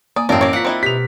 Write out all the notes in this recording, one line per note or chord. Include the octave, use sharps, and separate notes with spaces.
A#3 D5 G#5 D#6
A1 F#2 C4 A#4 D5 F5 A5
A#4 C#5 D5
F4 F#5 B6
C4 D#4 E4
B2 G4 B6 F7